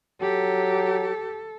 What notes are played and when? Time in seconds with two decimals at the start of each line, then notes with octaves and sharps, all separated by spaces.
0.22 F#3 G4 A4